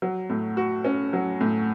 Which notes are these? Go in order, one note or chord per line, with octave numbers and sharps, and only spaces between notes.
F#3
A2
F#4
C#4
F#3
A2